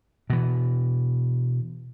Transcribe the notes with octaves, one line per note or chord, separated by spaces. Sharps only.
B2 E3